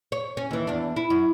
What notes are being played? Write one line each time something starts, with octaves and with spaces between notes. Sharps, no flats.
C#5
C#4
D#2 E3
E2 D4
E4
F#2